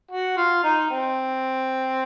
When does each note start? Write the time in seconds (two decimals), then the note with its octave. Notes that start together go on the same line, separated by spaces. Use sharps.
0.11 F#4
0.38 F4
0.64 D#4
0.91 C4